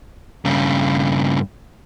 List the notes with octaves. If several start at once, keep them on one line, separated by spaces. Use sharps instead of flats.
G2 C#3